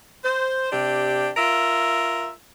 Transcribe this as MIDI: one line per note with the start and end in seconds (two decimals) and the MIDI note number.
0.24 0.71 72
0.72 1.30 48
0.72 1.30 62
0.72 1.30 67
1.37 2.30 65
1.37 2.30 70
1.37 2.30 76